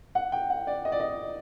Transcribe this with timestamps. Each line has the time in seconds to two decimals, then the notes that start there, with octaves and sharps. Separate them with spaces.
0.15 F#5
0.32 G5
0.50 F#5
0.67 D5
0.85 D#5
0.92 D5
1.00 D#5